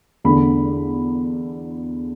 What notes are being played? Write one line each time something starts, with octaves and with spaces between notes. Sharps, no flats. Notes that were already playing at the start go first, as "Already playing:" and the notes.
E2 D3 A3 B5